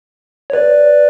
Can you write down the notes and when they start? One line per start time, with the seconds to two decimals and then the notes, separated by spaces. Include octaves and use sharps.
0.50 C#5
0.53 B4 D5